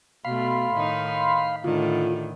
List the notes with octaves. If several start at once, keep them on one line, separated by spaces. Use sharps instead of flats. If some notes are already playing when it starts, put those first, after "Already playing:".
B2 A3 F5 B5 C6
A2 D#3 D#4
A2 D3 D#3 F4